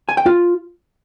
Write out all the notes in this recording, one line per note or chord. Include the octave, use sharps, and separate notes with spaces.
G#5
G5
F4